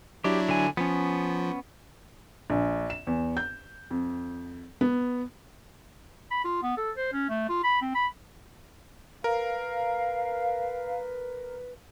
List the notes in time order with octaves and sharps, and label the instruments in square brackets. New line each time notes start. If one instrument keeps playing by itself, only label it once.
[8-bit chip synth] F#3 D4 E4 [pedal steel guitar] G4
[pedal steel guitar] D3 G#5
[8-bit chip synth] F3 [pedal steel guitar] B3 C#4
[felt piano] A#1
E7
E2
G6
F2
B3
[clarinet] B5
F4
B3
A4
C5
C#4
A3
F4
B5
C4
B5
[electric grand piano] A#4 [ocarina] B4 [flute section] F5